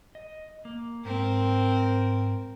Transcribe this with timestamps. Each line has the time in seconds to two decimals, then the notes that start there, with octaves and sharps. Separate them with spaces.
0.15 D#5
0.65 A#3
1.05 G#2 C4 A#4